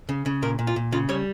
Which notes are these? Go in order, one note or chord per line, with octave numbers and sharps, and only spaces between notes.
C#3
C#3
A#2 A#4
A#2
F4
A#2
C#3 F4
G3 C#5